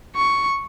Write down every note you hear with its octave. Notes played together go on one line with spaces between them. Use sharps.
C#6